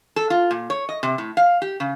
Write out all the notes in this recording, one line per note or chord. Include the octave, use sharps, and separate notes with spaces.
A4
F4
A#2
C#5
D#5
C3
A2
F5
G4
C#3